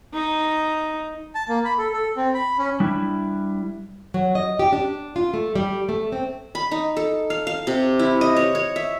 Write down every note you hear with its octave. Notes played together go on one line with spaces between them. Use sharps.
D#4
A5
A#3
B5
A4
A4
C4
B5
C#4
G3 D4 E4
F#3
D#5
G4
D4
F4
A3
G3
A3
C4
B5
D#4
A4
F5
F5
C3
E4
D#5
C#5
C#5
E5